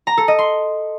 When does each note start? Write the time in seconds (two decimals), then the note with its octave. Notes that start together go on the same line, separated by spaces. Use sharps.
0.07 A#5
0.17 A4
0.28 D#5
0.39 C6